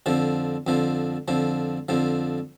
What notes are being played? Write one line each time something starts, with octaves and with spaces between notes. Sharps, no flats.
F2 D3 F3
F2 D3 F3
F2 D3 F3
F2 D3 F3